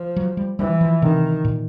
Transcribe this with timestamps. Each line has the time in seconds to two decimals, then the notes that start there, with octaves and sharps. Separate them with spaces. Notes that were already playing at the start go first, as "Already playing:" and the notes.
Already playing: F3
0.16 F#3
0.37 G3
0.59 E3 G3
0.81 F3
1.02 C3 D#3
1.45 A#2